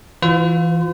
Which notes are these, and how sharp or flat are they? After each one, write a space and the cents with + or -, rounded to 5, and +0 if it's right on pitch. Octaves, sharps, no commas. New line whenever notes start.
E3 +15 F4 +25 C5 -45